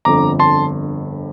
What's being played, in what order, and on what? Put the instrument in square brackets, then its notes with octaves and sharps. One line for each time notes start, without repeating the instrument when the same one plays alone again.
[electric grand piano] G1 F2 D3 A#5 D6
A5 C6